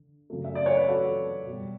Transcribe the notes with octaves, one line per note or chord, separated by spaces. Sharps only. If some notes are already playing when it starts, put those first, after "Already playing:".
Already playing: D3
F#2 C#3 F#3 A3
E5
D5
C#5
B4
F#4 A4
B2 G3